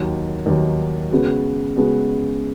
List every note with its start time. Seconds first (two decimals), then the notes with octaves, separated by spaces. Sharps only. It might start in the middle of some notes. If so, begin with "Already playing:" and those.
Already playing: D#2 D#3 F#3
0.46 D#2 D#3 F#3
1.11 C#3 G#3 B3 F#4
1.76 C#3 G#3 B3 F#4